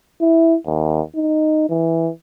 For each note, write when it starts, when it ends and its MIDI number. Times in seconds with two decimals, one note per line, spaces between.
0.20 0.56 64
0.66 1.01 39
1.15 1.67 63
1.69 2.10 52